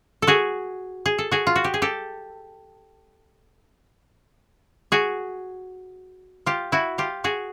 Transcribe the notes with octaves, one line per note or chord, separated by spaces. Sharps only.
A4
F#4 G#4
G#4
A4
F#4 G#4
F4
F#4
G4
G#4
G4 A4
F#4 G#4
F4 G4
E4 F#4
F4 G4
F#4 G#4